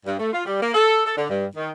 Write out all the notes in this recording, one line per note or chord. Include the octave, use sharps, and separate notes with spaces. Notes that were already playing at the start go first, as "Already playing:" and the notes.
G2
A3
F4
G3
A#3
A4
A4
D3
G2
D#3